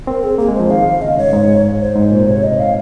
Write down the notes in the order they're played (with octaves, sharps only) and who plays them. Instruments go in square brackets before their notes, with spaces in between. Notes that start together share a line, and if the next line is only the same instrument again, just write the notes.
[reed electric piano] C4 [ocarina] A#4
[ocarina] G#4
[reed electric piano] A#3 [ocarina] G#4
[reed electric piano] G#3
[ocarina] C5
[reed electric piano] F3
[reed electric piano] D#3 [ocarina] F5
[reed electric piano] C#3 [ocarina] D#5
[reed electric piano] G#2 [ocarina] C#5
[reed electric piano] G#2
[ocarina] C5
[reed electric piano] G#2
A#2
[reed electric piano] C3 [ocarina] C#5
[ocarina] D#5
F5